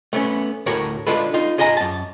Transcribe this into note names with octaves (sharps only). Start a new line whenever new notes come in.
A3 B3 C#4
D2 A2 F#4 A#4 C#5
D3 G#3 F4 A4 B4
D#4 F4
F4 G#4 D#5 G#5 A#5
F#2 A5